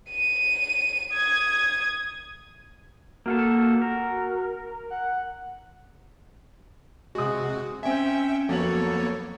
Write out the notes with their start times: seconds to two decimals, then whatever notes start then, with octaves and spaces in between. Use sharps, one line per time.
0.10 D#7
1.13 D#6 G#6
3.26 A#3 F4 F#4 A4
3.82 A#4
4.90 F#5
7.15 C3 G#3 F#4 D#6
7.83 C4 C#4 E5 G5 G#5
8.49 F2 F#3 A#3 B3 A4 C#5 F#7